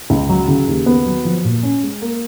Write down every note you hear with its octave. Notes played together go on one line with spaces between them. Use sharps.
C#2
F#3
C#3
D#2
B3
F#3
F3
A#2
C#4
G#3
A#3